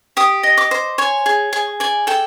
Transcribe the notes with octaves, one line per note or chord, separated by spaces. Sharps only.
G4 D#6
D#5
D6
C5
C#5 G#5
G#4
G#4
D5 G#5
A4 G5